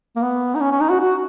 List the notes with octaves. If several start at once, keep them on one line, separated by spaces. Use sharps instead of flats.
A#3
B3
D#4
C#4
C#4
D#4
F#4
F#4